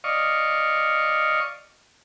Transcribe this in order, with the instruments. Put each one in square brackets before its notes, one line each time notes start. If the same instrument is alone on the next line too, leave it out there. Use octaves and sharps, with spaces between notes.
[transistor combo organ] D5 D#5 F5 C#6